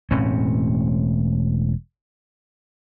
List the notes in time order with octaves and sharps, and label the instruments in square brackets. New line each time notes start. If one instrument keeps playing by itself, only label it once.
[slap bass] E1 A2 C4 C#4